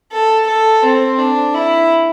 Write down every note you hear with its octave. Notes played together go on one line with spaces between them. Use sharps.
A4
A4
C4
D4
E4